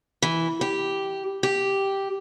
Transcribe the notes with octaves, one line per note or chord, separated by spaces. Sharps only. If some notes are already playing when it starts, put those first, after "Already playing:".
E3
G4
G4